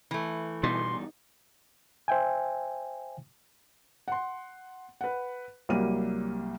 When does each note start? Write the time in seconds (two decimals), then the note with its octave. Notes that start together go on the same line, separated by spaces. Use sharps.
0.11 E3 A3
0.63 E2 G2 B2 D#4 C6
2.08 C5 E5 G5 G#5
4.08 F#5 C6
5.01 B4 F#5
5.69 C2 F#3 G3 A#3 D#7